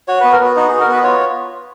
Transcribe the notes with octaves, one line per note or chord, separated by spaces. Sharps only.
F#4 C#5
B3 B4
A#4
B3 F#4
D#4 F#4
F#4 G#4
A#4
B3 B4
F4 C#5